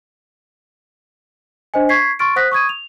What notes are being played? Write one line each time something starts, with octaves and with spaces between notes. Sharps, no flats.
D4 C5 D#5 G#5
C#6 G#6 B6 C7
C6 C#6 F6 A6 D7
C5 F#5 D#6 F#6 A#6 B6
C#6 D#6 G#6 D#7
F7